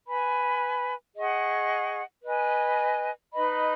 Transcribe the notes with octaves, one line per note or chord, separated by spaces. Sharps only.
B4 G#5 B5
G#4 D#5 F#5 C#6
B4 D#5 G#5
D#4 B4 D#5 B5